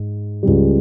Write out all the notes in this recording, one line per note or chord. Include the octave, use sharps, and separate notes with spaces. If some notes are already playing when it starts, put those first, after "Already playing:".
Already playing: G#2
C#2 C#3 G3